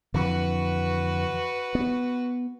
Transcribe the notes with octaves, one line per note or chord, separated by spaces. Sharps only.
F2 D3 E3 F#4 B4
B3